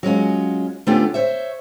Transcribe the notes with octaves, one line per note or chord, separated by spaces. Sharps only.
F#3 G#3 C#4 F4
D3 A3 B3 C#4 F4 G4
C5 C#5 E5